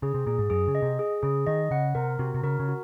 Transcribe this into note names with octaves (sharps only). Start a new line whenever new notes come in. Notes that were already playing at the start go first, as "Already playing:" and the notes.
C#3 G#4
C3
A#2 G#4
G#2
F#2 G#4
C#3
D#5
C3
G#4
C#3 G#4
D#3 D#5
C#3 F#5
C3 A#4
C3 F#4
C3
C#3 A#4
C#3
F#4